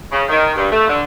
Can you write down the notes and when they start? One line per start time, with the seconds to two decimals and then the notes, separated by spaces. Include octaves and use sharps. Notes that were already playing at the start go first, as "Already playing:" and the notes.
0.10 C#3
0.29 D#3
0.55 G2
0.70 A3
0.88 D3